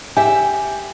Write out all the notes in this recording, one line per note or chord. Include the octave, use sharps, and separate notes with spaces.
G4 E5 G#5